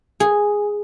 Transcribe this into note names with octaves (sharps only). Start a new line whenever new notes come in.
G#4